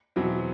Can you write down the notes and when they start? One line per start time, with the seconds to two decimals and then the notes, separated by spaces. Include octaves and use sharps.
0.16 E2 B2 F#3 C4 E4